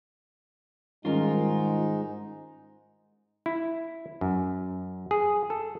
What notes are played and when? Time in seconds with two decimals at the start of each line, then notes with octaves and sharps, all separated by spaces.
1.05 G#2 D#3 G3 G#3 C#4 D#4 F4 A#4
3.46 E4
4.21 F#2
5.11 G#4
5.50 A4